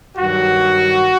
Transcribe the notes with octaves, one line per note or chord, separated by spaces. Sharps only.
G2 D#3 F#3 F#4